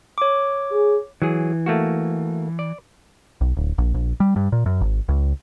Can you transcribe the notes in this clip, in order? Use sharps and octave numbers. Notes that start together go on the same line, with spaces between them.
C#5 D6
G#4
E3 F#3 G#4
A3 A#3 F#4
D5
B1
D1
A#1
A#1
G3
G2
A#2
F#2
G#1
C#2